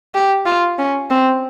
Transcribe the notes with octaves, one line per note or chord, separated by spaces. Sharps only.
G4
F4
C#4
C4